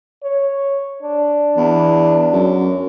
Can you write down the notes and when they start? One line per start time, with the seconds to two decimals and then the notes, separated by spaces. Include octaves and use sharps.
0.23 C#5
1.03 D4
1.56 E2
2.33 F#2